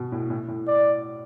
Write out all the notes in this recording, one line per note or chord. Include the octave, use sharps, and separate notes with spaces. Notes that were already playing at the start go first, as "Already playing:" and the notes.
Already playing: B2
A2
A2
A2
D5